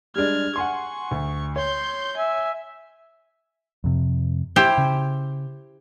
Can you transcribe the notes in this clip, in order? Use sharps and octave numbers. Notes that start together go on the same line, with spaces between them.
G3 G#3 D4 F6 G#6
F#5 G#5 C6 C#6
D2
C#5 C6 G6
E5 G#5
F2 C3
E4 G4 C5
C#3